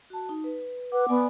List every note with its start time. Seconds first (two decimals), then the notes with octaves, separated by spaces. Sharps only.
0.10 F#4 A5
0.29 D#4
0.44 B4
0.92 B4 F#5 D6
1.09 B3 D5 G#5